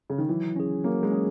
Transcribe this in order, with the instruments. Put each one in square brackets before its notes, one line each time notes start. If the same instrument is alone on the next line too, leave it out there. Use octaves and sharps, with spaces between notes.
[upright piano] C#3
D#3
[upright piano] E3 [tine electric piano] F#3
[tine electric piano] C#4 G#4
[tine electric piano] F#3 [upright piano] A#3
[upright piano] G#3
[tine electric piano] C#4 G#4